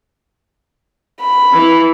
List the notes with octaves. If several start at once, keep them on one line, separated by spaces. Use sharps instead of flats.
B5
E3